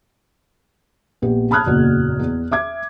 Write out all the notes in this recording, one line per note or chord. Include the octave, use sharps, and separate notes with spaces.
A#1 B3 G4
A5 B5 D#6 F6 F#6 G#6
F#1 E2 A#2 F#4
E2
E5 D6 G#6